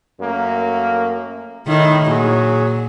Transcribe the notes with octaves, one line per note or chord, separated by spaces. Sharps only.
F#2 A3 A#3
A2 D#3 E4
A#2 F#3 G#4